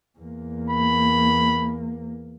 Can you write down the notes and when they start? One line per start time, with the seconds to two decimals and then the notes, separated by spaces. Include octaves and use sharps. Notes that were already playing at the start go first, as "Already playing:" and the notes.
0.18 E2 A#3
0.70 B5